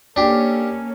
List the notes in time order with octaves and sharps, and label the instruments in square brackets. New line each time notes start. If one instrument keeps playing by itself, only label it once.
[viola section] A#3 C#4 A4 [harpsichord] D4 G4